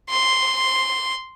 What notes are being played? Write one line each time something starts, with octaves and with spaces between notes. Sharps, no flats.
C6